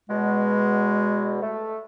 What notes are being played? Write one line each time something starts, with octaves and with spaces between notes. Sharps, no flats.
E2 B2 G#3
A3